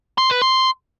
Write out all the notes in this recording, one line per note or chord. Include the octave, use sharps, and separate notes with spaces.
C6
B4
C6